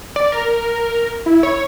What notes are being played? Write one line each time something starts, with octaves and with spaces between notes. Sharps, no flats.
D5
A#4
E4
C#5